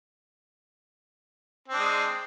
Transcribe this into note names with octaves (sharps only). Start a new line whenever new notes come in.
G#3 C4 D4